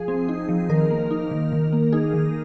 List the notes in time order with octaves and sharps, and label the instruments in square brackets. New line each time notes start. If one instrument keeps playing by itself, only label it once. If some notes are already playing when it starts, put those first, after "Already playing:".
Already playing: [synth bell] F3 G#4
C4
D#4
F3
D#3 A#4
A#3
D#4
D#3
D#3
A#3
D#4 G#4
D#3